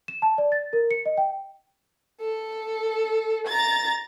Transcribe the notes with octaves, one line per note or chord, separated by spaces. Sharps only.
E7
A5
D5
A6
A#4
C#7
D#5
G5
A4
A#5 A6